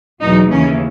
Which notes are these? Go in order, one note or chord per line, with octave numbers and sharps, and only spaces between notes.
E2 B2 F#3 D#4
D#2 C#3 E3 C#4